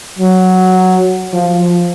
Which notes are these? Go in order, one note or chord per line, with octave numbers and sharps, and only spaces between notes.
F#3
F3